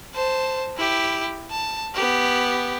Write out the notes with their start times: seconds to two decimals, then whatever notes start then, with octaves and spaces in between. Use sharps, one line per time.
0.14 C5 A5
0.77 E4 G4
1.51 A5
1.95 B3 G4